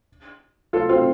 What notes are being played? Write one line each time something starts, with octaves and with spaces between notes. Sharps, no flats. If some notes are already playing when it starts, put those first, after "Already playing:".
F4 A4
C4 F4